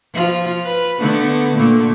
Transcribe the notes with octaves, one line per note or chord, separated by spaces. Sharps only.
F3 F4
B4
D3 A3 B3
A#2 D3 A3